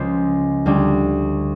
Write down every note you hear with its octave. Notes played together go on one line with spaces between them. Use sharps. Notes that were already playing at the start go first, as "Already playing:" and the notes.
Already playing: C#2 C#3 F3 G#3 C5
D2 D3 G3